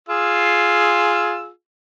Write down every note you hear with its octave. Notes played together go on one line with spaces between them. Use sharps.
F4 G#4 E6